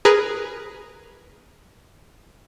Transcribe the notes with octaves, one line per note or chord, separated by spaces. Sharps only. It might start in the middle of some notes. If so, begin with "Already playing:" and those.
G#4 A#4 B4